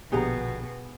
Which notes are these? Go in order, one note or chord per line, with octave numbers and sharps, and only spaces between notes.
A#1 B2 D3 B3 G4 G#4 G5 A#5